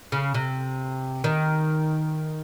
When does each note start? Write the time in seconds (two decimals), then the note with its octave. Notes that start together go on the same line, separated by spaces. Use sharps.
0.12 C#3
0.34 C3
1.24 D#3